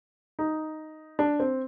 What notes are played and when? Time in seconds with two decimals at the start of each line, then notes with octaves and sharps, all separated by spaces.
0.39 D#4
1.19 D4
1.40 C4